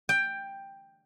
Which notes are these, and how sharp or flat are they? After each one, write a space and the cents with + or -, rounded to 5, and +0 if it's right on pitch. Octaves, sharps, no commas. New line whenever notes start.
G5 +10